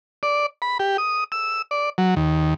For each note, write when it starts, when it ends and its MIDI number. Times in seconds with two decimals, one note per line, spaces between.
0.23 0.46 74
0.62 0.78 83
0.79 0.97 67
0.98 1.24 87
1.32 1.62 88
1.71 1.90 74
1.98 2.15 54
2.16 2.54 39